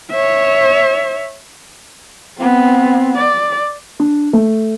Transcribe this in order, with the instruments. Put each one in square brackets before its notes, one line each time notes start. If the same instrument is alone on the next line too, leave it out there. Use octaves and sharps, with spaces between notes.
[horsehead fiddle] C#5 E5
B3 C4
D5
[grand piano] D4
A3